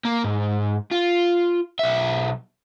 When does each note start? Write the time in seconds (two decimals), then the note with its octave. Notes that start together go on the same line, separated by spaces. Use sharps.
0.05 A#3
0.24 G#2
0.92 F4
1.79 B1 E5